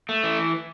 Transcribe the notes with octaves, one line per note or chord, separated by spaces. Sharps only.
A3
E3